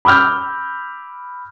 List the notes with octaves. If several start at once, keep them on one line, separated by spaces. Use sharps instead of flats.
B5 D6 E6 F6 G6